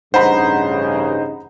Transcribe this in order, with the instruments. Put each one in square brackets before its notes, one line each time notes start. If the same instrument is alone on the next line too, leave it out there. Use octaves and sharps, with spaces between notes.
[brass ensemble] A1 G2 C#3 [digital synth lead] D#4 [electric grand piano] C5 [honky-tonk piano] F#5 A#5 B5